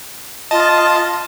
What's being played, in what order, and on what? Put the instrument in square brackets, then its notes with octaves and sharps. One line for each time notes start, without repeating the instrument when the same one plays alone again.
[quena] F4 [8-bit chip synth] D#5 A5